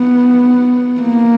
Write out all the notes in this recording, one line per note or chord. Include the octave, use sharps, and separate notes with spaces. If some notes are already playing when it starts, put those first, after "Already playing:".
Already playing: B3
A#3